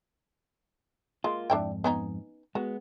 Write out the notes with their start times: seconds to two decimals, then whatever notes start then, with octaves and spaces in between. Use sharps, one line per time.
1.24 G#3 A#3 F4
1.50 F2 G#2 D4 E4 G5
1.84 B3 C#4 D#4
2.55 G#3 B3 F#4